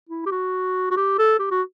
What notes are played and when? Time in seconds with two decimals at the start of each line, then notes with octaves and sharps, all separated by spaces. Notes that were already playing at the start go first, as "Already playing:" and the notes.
0.09 E4
0.26 G4
0.32 F#4
0.91 F#4
0.97 G4
1.19 A4
1.39 G4
1.51 F#4